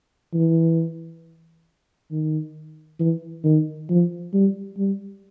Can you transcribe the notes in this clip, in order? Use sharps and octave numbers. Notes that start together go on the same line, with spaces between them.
E3
D#3
E3
D#3
F3
G3
G3